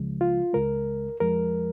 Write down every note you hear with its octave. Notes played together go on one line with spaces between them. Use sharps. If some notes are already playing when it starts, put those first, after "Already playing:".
Already playing: C#2 C#3 F3 G#3
F4
C#2 C#3 G#3 A#4
F2 F3 G#3 A#4